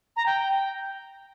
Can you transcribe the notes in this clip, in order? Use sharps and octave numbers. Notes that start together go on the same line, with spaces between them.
A#5
G5